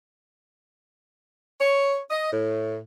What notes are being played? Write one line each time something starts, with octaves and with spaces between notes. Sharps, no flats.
C#5
D#5
A2